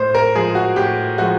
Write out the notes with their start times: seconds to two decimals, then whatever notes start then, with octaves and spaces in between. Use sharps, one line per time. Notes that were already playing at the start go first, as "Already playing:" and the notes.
Already playing: A2 C5
0.15 A#4
0.35 F3 G#3 G#4
0.55 F#4
0.76 A2 G4
1.18 F3 G#3 F#4